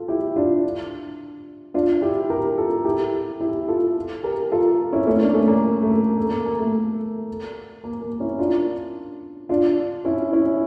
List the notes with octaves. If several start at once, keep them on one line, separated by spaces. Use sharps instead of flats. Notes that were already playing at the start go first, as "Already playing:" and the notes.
Already playing: F4 A4
E4 G4
D4 F4
D4 F4
E4 G4
G4 A#4
F4 A4
E4 G4
E4 G4
F4 A4
G4 A#4
F4 A4
C#4 E4
A3 C#4
A#3 D4
A3 C#4
A#3
A3
A#3
A#3
A#3
A#3
A3
A#3
A#3
C#4 E4
D4 F4
D4 F4
C#4 E4
C#4 E4